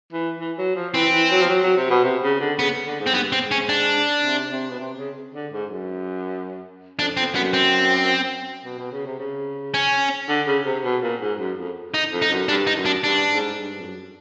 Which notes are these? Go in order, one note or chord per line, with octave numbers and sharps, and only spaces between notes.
E3
E3
F#3
F3
E3 C4
E3
F#3
F3
F#3
F#3
C3
B2
C3
C#3
D3
C#3 B3
D3
G#2
C4
G2 B3
C4
G#2
C#4
D4
C3
C3
B2
C3
C#3
D3
G#2
F#2
F2 D4
F2 C4
F#2 B3
C4
B2
B2
C#3
C3
C#3
C#4
D3
C#3
C3
B2
A#2
G#2
F#2
F2
D#4
F2
D#4
F#2
G2 D4
D#4
F#2
D4
G2 D4
G#2
G2
F2
F#2